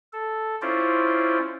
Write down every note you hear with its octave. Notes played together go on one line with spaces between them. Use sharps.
A4
C#4 E4 F4 C5 D5